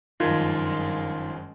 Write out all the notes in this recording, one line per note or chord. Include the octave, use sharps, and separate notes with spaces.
F#1 G2 D#3 F3 G#3 F4 G#6